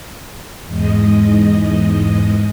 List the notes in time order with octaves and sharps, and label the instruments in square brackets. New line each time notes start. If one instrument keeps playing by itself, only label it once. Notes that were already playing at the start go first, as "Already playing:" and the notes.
[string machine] E2 G#2 G#3 D#5